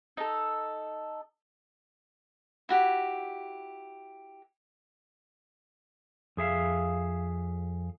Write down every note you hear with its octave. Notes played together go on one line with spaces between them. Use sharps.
D#4 A4
E4 F#4 G4
F2 G#4 E5 F5